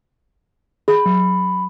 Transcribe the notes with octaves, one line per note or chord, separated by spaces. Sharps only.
G#4 B5
F#3